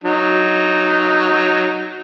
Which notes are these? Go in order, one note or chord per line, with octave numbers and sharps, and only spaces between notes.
F#3 D#4